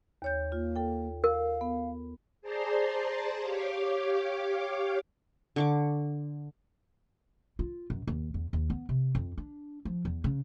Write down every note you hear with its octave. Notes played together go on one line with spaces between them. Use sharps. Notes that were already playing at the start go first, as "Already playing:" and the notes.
D#2 C#5 G6
A#3 F4
A4 G5
A#4 F5
B3
G#4 C5 D5 A5 A#5 C6
G4 C#5 F5 D6
D3 C#6 D6
F4
F#2
D#2
E2
D#2
B3
C3
F2
D4
F3
E2
C#3